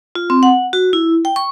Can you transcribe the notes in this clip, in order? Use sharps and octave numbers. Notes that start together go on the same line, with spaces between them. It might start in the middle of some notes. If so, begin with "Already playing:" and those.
F4
C4
F#5
F#4
E4
G5
C#6